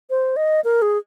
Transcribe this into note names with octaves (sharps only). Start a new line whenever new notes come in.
C5
D#5
A#4
G#4